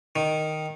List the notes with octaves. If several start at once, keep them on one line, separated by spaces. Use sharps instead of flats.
D#3